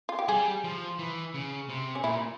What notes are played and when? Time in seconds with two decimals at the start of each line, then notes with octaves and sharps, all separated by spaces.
0.09 F4
0.19 G4
0.28 G3 G#4
0.64 F3
0.99 E3
1.34 C#3
1.69 C3
1.95 C#4
2.04 A#2 E4